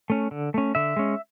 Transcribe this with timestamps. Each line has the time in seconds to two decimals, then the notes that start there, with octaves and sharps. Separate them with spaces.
0.10 A3 C#4
0.31 D3
0.54 A3 C#4
0.75 D3 E5
0.96 G#3 C#4